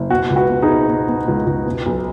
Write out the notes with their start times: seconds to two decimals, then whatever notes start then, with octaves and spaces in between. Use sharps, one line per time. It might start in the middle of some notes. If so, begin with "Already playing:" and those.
Already playing: F#1
0.10 B2 F#4
0.30 C#2
0.36 F#4 B4
0.49 B2
0.62 D#4 G#4
0.68 B2
0.88 B2
1.08 B2
1.28 C#2
1.46 C#2
1.66 B2
1.86 B1